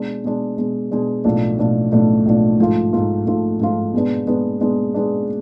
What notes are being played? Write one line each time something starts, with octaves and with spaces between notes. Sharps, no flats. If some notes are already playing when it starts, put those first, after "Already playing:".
Already playing: B2 G#3 D4
B2 G#3 D4
B2 G#3 D4
B2 G#3 D4
B1 A2 F3 A3 D4
B1 A2 F3 A3 D4
B1 A2 F3 A3 D4
B1 A2 F3 A3 D4
G#2 F3 A3 F4
G#2 F3 A3 F4
G#2 F3 A3 F4
G#2 F3 A3 F4
B2 G#3 B3 D4
B2 G#3 B3 D4
B2 G#3 B3 D4
B2 G#3 B3 D4